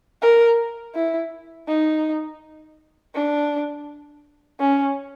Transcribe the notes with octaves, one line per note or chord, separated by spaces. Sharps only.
A#4
E4
D#4
D4
C#4